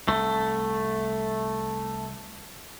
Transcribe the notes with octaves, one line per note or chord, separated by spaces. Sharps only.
C2 A3